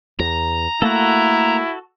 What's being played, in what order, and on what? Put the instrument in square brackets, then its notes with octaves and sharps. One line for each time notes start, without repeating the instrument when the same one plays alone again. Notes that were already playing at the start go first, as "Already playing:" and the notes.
[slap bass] E2 [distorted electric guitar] A#5
[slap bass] A3 A#3 [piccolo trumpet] E4 [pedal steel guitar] F#4 A4